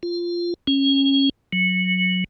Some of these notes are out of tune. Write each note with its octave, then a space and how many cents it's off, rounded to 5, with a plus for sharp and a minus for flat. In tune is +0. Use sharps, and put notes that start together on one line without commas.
F4 -10
C#4 -20
F#3 -10